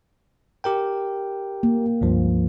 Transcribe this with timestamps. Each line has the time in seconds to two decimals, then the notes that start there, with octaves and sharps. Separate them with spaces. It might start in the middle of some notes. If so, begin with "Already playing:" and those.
0.64 G4 A#4 G5
1.63 A#3
2.01 C#2 G2 F3